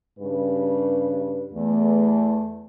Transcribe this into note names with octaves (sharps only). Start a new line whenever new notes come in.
G2 C#3 B4
E2 A3